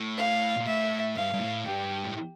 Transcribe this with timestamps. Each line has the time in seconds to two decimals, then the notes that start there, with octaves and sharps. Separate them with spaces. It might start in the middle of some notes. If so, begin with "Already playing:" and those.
Already playing: A2
0.18 F5
0.57 A#2
0.66 A2 E5
1.15 G2 F5
1.33 G2
1.39 A2
1.64 G2 G4
2.05 A2